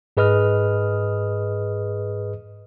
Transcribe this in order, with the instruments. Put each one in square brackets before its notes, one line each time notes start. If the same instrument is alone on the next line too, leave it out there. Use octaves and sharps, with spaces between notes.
[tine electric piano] G#2 G#4 B4 D#5 D#6 F6